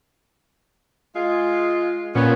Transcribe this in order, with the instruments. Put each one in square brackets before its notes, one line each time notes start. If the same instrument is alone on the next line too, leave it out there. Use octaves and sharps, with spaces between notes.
[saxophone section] G#3 F4
[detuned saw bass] A#2 [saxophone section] B3 C#4